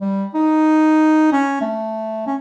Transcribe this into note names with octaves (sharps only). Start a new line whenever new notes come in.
G3
D#4
C#4
A3
C#4